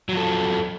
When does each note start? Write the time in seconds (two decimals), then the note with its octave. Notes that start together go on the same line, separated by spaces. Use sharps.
0.09 F#3
0.13 F3
0.17 A4